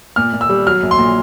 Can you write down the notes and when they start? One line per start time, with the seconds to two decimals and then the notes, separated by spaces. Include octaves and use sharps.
0.16 A#2 F6
0.33 A#2
0.41 E6
0.49 G3
0.67 F#3 F6
0.83 A#1
0.91 C6
0.98 A#2